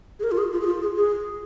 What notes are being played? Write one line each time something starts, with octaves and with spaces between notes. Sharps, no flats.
G#4
A#4
F4
G#4
F4
G#4
F4
G#4
G#4